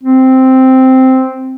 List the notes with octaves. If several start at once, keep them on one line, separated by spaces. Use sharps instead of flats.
C4